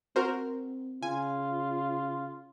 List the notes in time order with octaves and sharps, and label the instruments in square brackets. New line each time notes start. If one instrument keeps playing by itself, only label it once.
[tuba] C4 [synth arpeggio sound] F#4 A#4 C5
[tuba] C#3 [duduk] F4 [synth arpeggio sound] G#5